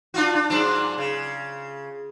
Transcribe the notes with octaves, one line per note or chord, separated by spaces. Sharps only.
D4 F4 F#4
D4
G#2 F#3 D4
C#3